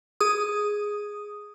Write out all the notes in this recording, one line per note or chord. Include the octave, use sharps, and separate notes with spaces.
G#4 D#6